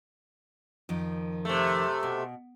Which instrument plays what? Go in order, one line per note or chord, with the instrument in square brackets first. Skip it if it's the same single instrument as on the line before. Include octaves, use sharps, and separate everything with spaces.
[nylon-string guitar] F2 D#3 F3
[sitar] C3 A3
[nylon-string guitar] B2